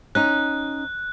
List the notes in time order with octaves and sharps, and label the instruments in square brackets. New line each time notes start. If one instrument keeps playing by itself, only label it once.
[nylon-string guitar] C#4 D#4 [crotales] F#6